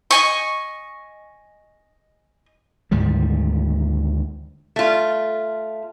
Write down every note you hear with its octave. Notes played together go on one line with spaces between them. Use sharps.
D#5 G#5 C#6
D2 G#2 D#3 G3
A3 F4